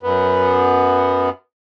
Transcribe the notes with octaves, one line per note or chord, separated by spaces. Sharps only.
F#2 B3